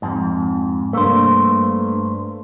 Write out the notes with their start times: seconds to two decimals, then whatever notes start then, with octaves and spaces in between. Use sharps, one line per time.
0.02 F2 G#2
0.93 G2 A3 A#3 C5